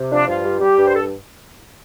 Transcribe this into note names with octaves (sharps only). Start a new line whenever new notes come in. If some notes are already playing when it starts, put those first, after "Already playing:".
Already playing: C3
F3 D4
G2 F4
G3
G3 G4
G2
C5
A4